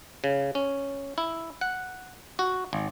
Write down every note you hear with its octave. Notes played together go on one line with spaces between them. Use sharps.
C#3
C#4
E4
F#5
F#4
G#1